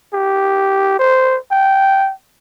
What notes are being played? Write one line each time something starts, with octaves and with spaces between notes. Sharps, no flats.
G4
C5
G5